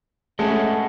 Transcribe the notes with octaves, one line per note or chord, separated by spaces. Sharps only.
G#3 A3 C#4 D#5 F#5 A5